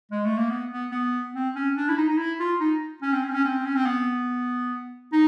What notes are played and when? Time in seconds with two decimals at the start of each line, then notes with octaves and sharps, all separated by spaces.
0.11 G#3
0.25 A3
0.38 A#3
0.50 B3
0.71 B3
0.91 B3
1.34 C4
1.55 C#4
1.76 D4
1.89 E4
1.97 D#4
2.08 D#4
2.18 E4
2.40 F4
2.60 D#4
3.02 C#4
3.13 C4
3.23 C#4
3.29 C4
3.33 C#4
3.45 C4
3.65 C#4
3.75 C4
3.86 B3
5.12 D#4